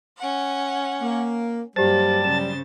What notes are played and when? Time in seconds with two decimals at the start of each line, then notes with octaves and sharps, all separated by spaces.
0.18 C#4 F#5
1.02 A#3
1.76 G2 F#3 G3 A#3 G4 C5 A5
2.24 C#3 C5 A6 E7